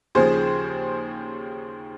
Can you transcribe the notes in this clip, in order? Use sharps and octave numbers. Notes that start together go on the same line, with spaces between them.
D#2 C#3 F3 G#4 C5